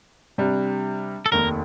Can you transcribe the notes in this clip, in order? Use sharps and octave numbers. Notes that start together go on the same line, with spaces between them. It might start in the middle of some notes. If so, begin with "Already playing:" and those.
C3 G3 D4
A4
F1 D#2 D#3 A#4